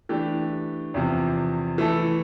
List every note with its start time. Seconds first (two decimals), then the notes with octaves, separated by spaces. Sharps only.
0.09 E3 A3 D4 G4
0.94 E2 C3 F3
1.78 E3 A3 E4 A4